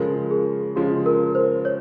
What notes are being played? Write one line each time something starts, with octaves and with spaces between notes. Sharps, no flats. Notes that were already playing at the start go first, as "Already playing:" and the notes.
Already playing: C#3 F3 G#3 A#4
G#4
C#3 F3 G#3 G4
A#4
C5
C#5